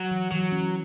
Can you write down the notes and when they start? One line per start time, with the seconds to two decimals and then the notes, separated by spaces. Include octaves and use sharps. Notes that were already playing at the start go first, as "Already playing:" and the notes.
Already playing: F#3
0.11 E3
0.31 E3 F#3
0.52 C#4